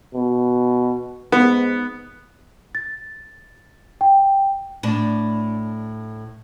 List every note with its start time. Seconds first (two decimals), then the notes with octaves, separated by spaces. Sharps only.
0.15 B2
1.32 G#2 B3
2.75 A6
4.01 G5
4.83 A2 D4